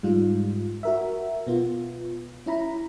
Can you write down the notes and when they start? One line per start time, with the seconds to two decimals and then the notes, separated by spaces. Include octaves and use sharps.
0.03 G#2 G3 F4
0.83 F#4 A#4 E5
1.47 B2 B3 F4
2.46 C#4 E4 A#5 B5